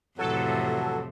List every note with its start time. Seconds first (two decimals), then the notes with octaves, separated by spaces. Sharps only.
0.19 F2 A2 C3 E3 F#3 A4